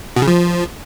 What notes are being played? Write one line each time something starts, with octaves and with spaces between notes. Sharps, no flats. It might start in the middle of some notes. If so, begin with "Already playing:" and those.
B2
C#3
F3